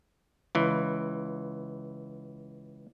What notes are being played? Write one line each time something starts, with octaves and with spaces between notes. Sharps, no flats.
C#2 E3